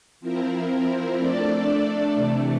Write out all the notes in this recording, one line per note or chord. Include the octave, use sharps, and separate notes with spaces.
F3 C4 E4 A#4
A3 D4 A4 D5
C3 E3 A3